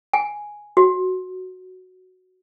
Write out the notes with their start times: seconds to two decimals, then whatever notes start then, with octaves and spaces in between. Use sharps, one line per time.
0.13 G#5
0.77 F#4